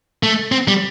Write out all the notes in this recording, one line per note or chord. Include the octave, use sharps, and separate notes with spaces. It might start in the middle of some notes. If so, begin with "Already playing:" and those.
A3
C4
G3